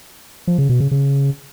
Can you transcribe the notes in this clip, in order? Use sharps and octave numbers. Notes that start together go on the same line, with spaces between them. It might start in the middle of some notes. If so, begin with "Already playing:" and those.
F3
C#3
B2
C#3
C#3